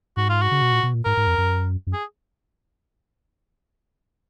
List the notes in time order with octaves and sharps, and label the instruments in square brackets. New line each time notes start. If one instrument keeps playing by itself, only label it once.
[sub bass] G#2 [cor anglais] F#4
[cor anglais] F4
F#4
[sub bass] C#3
B2
A#2
B2
A#2
[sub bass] G#2 [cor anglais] A#4
[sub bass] G#2
F2
F#2
F#2
[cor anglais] G#4